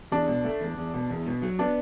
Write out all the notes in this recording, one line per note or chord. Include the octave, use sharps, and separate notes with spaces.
E2 D4
B2
A3
E2
E2
B2
E2
B2
F#3
B3 D4